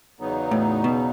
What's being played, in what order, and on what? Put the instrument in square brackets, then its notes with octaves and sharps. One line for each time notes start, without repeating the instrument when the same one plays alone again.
[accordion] E2 C#3 F#3 B3 D#4
[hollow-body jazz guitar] A2
B2